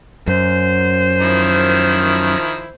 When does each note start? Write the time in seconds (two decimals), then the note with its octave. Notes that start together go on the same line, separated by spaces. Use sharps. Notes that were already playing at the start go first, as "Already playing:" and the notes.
0.28 F#2 C5
1.21 D#3 F3 E4